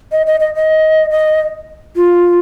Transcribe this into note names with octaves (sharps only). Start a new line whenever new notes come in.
D#5
D#5
D#5
D#5
D#5
F4